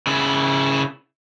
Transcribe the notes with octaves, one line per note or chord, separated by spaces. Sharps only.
C#3 E4